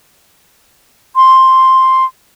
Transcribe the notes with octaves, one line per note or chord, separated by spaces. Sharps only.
C6